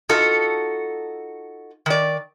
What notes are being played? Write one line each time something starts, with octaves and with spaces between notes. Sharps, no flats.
D#4 F4 F#4 A4
D#3 D5